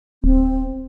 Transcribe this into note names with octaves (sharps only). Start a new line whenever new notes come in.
D1 C4